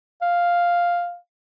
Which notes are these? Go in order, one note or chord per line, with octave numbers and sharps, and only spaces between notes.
F5